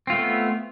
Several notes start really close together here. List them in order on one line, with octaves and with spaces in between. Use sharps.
C4 F4 A3 B3